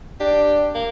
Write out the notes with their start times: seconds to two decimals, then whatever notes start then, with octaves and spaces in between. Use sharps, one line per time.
0.20 D4 G4
0.75 A#3